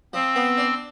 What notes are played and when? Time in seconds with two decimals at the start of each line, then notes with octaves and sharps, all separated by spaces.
0.13 F3 C4
0.36 B3
0.58 D4